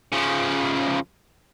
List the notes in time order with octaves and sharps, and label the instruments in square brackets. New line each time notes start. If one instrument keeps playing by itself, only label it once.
[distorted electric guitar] C#3 F3